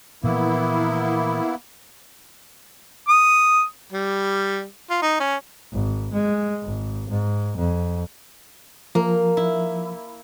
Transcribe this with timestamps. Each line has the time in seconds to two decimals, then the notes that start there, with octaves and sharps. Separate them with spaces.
0.24 A#2 E3 F3 A#3 B3 E4
3.08 D#6
3.92 G3
4.90 F4
5.02 D#4
5.20 C#4
5.73 G#1
6.13 G#3
6.63 G#1
7.10 G#2
7.57 F2
8.95 F3 A#3
9.37 E4